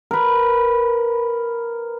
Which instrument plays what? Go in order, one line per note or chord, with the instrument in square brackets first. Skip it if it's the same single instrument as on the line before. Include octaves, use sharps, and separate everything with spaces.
[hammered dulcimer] A#4 B4